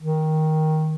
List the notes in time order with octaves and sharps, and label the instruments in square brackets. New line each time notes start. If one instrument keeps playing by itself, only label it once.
[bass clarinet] D#3